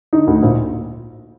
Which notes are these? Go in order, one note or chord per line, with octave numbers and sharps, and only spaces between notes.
D3 D#4
D2
A#1